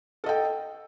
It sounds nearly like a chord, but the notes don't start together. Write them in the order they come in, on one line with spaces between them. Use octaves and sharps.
A4 D#5 G5